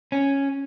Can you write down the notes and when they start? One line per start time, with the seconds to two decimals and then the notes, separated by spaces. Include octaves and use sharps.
0.12 C#4